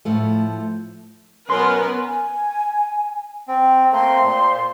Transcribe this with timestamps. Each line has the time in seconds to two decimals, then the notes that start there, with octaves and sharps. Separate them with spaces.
0.05 A2 F3 A3
1.50 B2 F#3 B3 C#4 A#4 B4 C6
2.06 G#5
3.48 C4
3.92 A3 A#3 C4 C5 C6
4.23 A#2